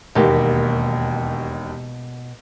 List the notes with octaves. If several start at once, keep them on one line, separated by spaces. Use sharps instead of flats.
E1 D#2 B2 A#3 G4